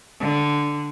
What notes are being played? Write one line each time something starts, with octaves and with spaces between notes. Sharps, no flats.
D3